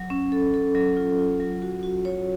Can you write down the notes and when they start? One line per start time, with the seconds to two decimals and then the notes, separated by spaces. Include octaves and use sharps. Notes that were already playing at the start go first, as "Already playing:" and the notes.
Already playing: F#3
0.10 C#4
0.32 A4
0.54 A4
0.75 F#3
0.97 F4
1.19 F4
1.40 F#3
1.62 F#4
1.83 F#4
2.05 C#5